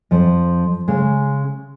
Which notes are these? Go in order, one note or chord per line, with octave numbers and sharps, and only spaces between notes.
F2 F3
C#3 G#3